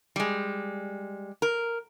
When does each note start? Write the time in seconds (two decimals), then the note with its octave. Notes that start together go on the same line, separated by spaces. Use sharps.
0.16 G3 G#3
1.42 A#4